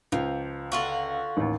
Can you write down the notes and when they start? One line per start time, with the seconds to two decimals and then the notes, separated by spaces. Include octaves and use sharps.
0.12 C#2 F3
0.72 D3 F4 F#4
1.37 A1 D#2